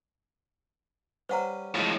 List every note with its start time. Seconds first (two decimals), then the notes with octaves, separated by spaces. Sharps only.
1.29 G3 C#4 B4 C5 F#5 A#5
1.74 F2 A2 C#3 G#3 F4